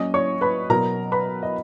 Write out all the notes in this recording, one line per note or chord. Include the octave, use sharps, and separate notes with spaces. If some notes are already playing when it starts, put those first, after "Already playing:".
Already playing: F#3 A#3 C#4 D#5 D#6
C#5 C#6
B4 B5
B2 F#3 B3 A#4 A#5
B4 B5
D#5